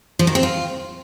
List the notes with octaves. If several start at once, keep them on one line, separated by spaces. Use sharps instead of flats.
F3
D#3
C4
F4